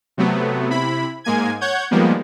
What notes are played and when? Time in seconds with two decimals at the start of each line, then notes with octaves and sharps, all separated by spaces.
0.17 C3 F#3 A3 B3
0.70 C3 E4 B5
1.24 G#2 G#3 A#3 G#5 G#6
1.61 C#5 F#5 G6 G#6
1.91 D#3 F3 G3 G#3 A#3 B3